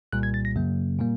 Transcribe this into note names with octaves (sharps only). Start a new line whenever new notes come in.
C2 A#2 G3 F#6
G#6
A6
A#6
F#2 C#3 F#3 A#3
A#2 G3 A#3